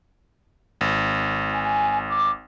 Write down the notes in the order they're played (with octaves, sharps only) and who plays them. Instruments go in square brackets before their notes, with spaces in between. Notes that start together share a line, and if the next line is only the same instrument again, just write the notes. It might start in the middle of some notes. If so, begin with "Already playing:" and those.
[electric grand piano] G#1
[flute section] G#5
D6